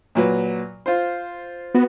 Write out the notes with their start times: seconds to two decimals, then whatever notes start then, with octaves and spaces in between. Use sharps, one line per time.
0.15 A#2 F#3 B4
0.86 F4 C5
1.75 B3 F#4